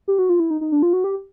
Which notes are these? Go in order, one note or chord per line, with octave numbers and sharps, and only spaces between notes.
G4
F#4
F4
E4
D#4
D#4
D4
F4
F#4
G4